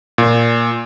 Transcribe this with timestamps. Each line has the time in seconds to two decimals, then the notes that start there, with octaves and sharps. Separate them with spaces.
0.18 A#2